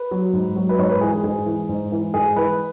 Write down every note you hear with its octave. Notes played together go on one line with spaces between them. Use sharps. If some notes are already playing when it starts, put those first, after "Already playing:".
Already playing: B4
F#3
G#2
F#3
B4
G#2 C#5
B4
E3 G#4
G#4
G#2 G#4
E3
G#2
E3
G#2 G#4
E3 B4